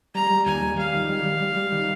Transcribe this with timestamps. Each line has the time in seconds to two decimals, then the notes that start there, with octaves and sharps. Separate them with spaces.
0.14 G3 A#5
0.31 G3
0.46 D#2 G#5
0.62 G3
0.78 G3 F5
0.94 D#3
1.09 G3
1.25 G3
1.41 G3
1.56 G3
1.72 D#3